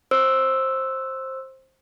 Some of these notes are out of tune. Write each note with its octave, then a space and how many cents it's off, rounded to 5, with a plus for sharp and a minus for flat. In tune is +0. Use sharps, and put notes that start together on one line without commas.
C5 +15 E6 +0